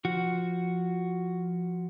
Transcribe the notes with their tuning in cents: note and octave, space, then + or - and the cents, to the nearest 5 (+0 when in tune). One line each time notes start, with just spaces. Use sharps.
F3 +0 F#4 +0